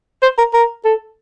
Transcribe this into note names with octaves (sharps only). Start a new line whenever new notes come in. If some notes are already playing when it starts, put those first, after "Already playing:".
C5
A#4
A#4
A4